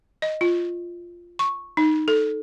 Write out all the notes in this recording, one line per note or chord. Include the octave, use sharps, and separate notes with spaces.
D#5
F4
C#6
D#4
A4